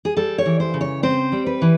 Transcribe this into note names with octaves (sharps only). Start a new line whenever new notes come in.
G#4
G3 A4
C#5
E3
C5
C#3
C#5
C4 C5
G3
B4
E3